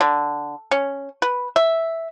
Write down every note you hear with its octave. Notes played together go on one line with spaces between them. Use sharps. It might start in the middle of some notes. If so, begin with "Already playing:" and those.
D3
C#4
B4
E5